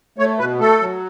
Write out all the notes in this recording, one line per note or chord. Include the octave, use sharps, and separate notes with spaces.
A3 C#5
B2 B4
A3 A4
F#3